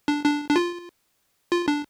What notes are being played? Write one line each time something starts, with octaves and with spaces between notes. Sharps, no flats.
D4
D4
D4
F4
F4
D4